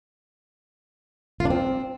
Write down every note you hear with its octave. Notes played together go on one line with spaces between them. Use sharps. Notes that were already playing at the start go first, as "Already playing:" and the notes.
F4
D4
C4